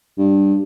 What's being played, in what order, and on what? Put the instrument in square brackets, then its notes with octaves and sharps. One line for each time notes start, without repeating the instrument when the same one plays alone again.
[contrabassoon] G2